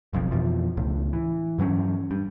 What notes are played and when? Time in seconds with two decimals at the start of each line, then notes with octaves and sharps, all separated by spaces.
0.13 F#1 B1 F2
0.31 F2 B2 E3 F3
0.77 C#2 A2
1.13 E3
1.58 G2 E3 F#3 C#4
2.11 G2